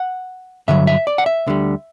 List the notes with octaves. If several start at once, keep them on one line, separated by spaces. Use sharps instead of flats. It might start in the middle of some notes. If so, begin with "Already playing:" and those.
Already playing: F#5
G2 D3 F#3 E5
E5
D5
F#5
E5
D2 D3 G3